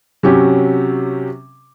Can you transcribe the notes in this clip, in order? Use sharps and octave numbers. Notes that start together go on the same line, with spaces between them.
C3 F#3 C#4 G4